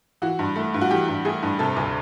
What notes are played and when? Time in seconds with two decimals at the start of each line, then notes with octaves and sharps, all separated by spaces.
0.22 E3 F#4
0.39 G2
0.56 A3
0.74 G2
0.81 F#4
0.91 E3 G4
1.08 G2
1.25 A3 G#4
1.42 G2
1.59 C3 A4
1.76 D2